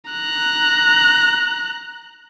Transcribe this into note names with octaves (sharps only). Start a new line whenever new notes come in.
A#5 F#6